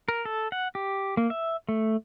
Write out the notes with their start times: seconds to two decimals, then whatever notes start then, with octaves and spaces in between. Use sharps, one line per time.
0.08 A#4
0.25 A4
0.52 F#5
0.75 G4
1.17 A#3
1.30 E5
1.69 A3